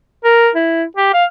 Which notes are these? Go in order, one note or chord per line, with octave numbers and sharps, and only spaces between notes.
A#4
E4
G4
F5